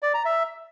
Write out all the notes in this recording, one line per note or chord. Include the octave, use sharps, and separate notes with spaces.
D5
A#5
E5